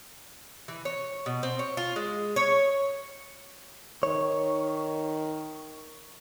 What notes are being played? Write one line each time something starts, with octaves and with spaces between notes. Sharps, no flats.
E3
C#5
B2
C4
C#5
F4
G#3
C#5
D#3 C#5